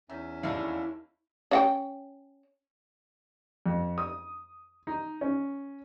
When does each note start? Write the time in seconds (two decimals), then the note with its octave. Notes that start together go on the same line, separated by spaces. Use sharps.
0.09 E2 D#3 C#4 E5
0.43 D#2 G#3 A3 D4 E4
1.51 C#4 F#5 G5
3.66 F2
3.98 D#6
4.87 D#4
5.21 C#4